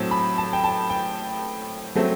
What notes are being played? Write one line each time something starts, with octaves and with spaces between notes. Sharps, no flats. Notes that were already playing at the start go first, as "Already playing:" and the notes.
Already playing: A2 F#3 C4 A5
B5
A5
G5
A5
G5
F#3 A3 C4